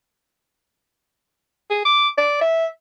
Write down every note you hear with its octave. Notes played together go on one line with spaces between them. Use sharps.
G#4
D6
D5
E5